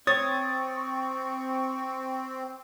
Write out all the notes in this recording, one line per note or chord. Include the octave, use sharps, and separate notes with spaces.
C4 C#5 C#6 D#6 A6